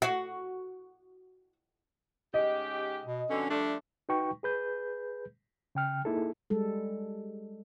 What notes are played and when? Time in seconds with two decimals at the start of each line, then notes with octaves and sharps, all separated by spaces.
0.02 F#4 F#5
2.34 G#2 C#4 G4 D#5
3.05 B2
3.29 F2 B2 D3 C#4
3.50 F3 G3 A3 D4
4.09 D#4 F#4 B4 G5 C#6
4.43 G#4 B4 G6
5.75 C#3 G5 F6
6.05 A#3 D#4 E4 G#4 A4
6.50 G3 G#3 A4